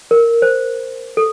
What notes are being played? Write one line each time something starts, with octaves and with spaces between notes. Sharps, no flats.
A#4
C5
A4